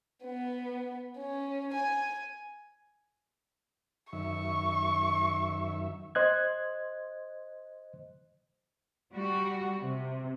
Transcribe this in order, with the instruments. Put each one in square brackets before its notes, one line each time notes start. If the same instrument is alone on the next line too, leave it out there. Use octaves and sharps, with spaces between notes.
[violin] B3
C#4
G#5
[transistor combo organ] F#2 D#3 E5 [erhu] C#6
[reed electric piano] C5 D#5 F#6 G#6
[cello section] G3 F#4
C3